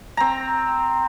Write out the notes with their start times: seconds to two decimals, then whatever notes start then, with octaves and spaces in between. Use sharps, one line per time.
0.17 C4 A#5